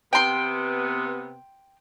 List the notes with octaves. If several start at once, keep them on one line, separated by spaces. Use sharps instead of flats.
C3 B3 G5 C6